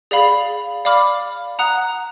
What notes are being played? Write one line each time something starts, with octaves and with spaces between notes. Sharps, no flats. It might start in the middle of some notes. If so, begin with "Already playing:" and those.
G#4 D5 F5 B5
D5 F5 B5 D6 F6
F#5 A#5 D#6 F#6